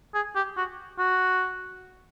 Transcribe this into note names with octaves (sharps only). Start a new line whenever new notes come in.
G#4
G4
F#4
F#4